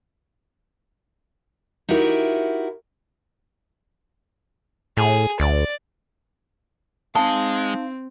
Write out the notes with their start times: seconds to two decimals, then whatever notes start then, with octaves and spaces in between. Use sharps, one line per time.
1.89 D#4 E4 F#4 G4 A#4
4.97 A2 G#4
5.40 D2 D5
7.15 G#3 C4 D#4 F5 A5